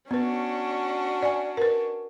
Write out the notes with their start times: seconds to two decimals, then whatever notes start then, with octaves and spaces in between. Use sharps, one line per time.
0.11 B3 C#4 D4 F#4 B4
1.22 D5 G#5
1.57 A#4 B4